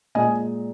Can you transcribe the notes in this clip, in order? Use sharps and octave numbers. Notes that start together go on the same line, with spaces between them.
A#2 G#3 D#5 G#5